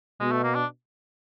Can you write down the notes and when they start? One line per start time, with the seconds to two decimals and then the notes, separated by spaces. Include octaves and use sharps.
0.20 B2 G#3
0.32 A3
0.43 A#3
0.55 D4